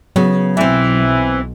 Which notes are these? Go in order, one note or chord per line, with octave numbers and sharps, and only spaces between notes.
C#3 F#3 B3
B1 E3 C4 E5